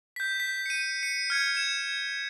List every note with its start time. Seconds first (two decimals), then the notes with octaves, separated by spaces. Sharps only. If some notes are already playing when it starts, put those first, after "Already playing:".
0.16 G6 B6
0.40 B6
0.66 C#7 D#7
1.03 C#7
1.30 F6 G#6 C#7
1.55 G#6 E7